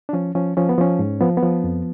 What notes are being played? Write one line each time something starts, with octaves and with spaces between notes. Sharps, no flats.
D4
F3 C#4
F3 C#4
F3 C#4
B3
F3 C#4
G#2
F3 B3
B3
F3
F2